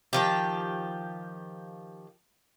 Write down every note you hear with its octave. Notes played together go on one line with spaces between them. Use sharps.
D#3 F3 G4